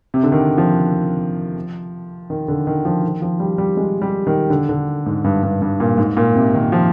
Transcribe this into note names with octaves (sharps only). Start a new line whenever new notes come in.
C3
D3
D#3
F3
D#3
D3
D#3
F3
D#3
F3
G3
G3
G#3
G3
D#3
D3
D3
G#2
G2
G2
G2
A#2
G#2
A#2
C3
D#3
F3